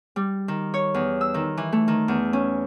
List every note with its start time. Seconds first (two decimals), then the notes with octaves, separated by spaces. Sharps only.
0.16 G3
0.48 D#3
0.74 C#5
0.94 E2
1.21 E6
1.34 D#3
1.57 E3
1.72 A3
1.88 D#3
2.08 E2
2.33 C#4